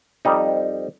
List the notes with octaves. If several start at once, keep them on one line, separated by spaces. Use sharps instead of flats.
F2 G3 D#4